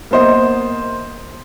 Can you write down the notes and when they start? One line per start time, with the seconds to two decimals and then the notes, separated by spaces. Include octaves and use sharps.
0.11 A#3 B3 C5 D#5